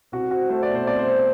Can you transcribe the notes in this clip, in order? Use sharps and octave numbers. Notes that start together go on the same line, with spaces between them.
C2 F#4
C4 F#4
A3 C5
D5
B2
C5
C2 D5
C5
C4